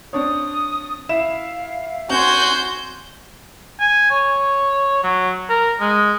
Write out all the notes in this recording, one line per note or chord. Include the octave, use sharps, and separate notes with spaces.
C4 D4 C#5 D#6
E4 E5 F5 E7
C4 F#4 G#5 C6 G6
G#5
C#5
F#3
A#4
G#3